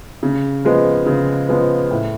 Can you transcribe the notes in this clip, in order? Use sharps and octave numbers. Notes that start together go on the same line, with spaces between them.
C#3
F3 G#3 B3
C#3
F3 G#3 B3
A2